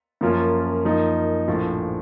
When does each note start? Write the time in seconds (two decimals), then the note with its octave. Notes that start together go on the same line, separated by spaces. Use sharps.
0.21 F#2 F3 A#3 C#4 F4
0.85 F#2 F3 A#3 D#4
1.48 A#1 A2 F3